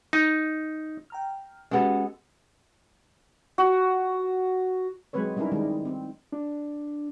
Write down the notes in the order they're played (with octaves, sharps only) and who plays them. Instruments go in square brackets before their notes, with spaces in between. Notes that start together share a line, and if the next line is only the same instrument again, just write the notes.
[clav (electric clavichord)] D#4
[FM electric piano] G5 A#5 F6
[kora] G#3 B3 A4 [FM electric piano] C#4 F#4 G4
[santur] F#4
[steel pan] F#3 G#3 C4 B4 C#5
G3 C#4 D#4 E4 A#4
D#3 G3 G#3 D#4
C4
[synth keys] D4